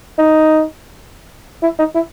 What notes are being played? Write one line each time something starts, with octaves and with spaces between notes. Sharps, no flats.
D#4
E4
D#4
E4